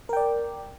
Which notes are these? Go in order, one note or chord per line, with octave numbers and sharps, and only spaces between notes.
A#4 D5 G5